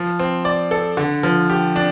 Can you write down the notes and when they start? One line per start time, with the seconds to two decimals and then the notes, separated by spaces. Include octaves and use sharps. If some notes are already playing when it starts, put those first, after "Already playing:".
Already playing: F3
0.19 C4
0.45 D5
0.71 A4
0.97 D3
1.23 F3
1.50 G4
1.76 D4